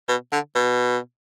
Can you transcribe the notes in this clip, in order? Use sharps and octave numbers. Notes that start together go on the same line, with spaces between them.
B2
D3
B2